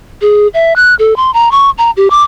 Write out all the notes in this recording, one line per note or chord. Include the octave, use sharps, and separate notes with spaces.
G#4
E5
F#6
A4
C6
A#5
C#6
A#5
G4
D6